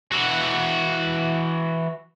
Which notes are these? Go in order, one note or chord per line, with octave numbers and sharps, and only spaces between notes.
E3 F#4